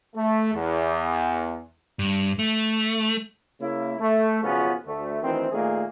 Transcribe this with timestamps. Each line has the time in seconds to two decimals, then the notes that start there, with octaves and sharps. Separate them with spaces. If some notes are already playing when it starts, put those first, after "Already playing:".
0.15 A3
0.54 E2
1.99 G2
2.39 A3
3.61 C#3 A#3 E4
4.00 A3
4.43 B1 F2 C#3 B3 C#4 F4
4.87 D2 A3
5.23 D2 D#3 E3 C4
5.52 A#2 D#3 A3 A#3 G#4